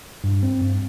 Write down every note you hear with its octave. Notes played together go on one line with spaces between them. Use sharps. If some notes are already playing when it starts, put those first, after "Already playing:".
G2
C4
G2